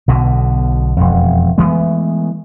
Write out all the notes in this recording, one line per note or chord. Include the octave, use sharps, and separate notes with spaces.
B1 B2 D3
E1 F2
E3 G#3 A3 B3